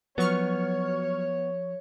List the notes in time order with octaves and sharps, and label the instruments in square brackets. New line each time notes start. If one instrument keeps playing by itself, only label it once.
[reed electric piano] F3 [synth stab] F#3 C#6 F6 [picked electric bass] B3 [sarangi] C#5